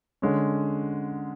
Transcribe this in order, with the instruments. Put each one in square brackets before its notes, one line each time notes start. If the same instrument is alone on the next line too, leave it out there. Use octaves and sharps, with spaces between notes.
[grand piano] D3 G#3 C#4